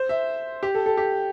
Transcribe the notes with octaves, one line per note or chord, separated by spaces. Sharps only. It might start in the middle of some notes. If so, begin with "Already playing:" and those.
Already playing: C5
E5
G4
A4
A4
G4